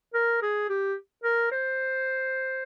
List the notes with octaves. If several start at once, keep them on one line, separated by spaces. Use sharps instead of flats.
A#4
G#4
G4
A#4
C5